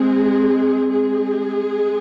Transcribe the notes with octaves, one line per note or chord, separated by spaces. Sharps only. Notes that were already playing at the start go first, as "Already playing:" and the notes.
Already playing: G#3 C4 G#4
G#3 G#4